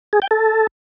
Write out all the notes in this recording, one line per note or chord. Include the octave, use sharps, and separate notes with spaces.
G#4
G5
A4